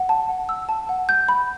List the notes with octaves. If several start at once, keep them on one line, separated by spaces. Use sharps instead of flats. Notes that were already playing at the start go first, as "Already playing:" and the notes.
Already playing: F#5
A5
F#5
E6
A5
F#5
G6
B5